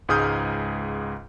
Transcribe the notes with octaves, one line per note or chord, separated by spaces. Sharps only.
C#2 G#2 G#4 D#6 F6 G6